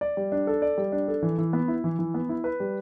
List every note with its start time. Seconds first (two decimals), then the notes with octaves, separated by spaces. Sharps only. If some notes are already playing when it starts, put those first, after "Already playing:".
0.01 D5
0.17 G3
0.32 D4
0.47 A4
0.62 D5
0.78 G3
0.92 D4
1.08 A4
1.23 E3
1.38 E3
1.53 B3
1.68 E4
1.84 E3
1.99 E3
2.14 B3
2.29 E4
2.44 B4
2.60 G3